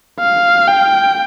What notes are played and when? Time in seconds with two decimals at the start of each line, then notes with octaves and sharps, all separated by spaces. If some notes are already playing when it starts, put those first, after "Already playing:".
0.20 F5
0.67 G5